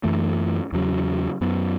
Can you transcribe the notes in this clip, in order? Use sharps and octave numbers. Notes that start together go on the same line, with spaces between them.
F#2 E3 A3
E2 C#3 F#3
F#2 F#3 B3